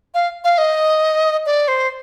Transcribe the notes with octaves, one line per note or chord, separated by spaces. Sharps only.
F5
F5
D#5
D5
C5